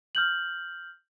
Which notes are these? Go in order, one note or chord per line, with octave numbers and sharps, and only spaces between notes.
F6 G6 F#7